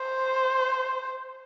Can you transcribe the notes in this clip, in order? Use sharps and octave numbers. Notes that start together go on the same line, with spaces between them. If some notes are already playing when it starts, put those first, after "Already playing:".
Already playing: C5